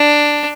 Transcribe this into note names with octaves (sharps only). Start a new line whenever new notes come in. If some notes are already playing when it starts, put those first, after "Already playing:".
Already playing: D4